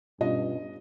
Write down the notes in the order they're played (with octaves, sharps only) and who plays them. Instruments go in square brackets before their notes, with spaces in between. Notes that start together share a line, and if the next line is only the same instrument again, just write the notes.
[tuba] G2 [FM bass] B2 [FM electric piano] C#4 F4 [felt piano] D#5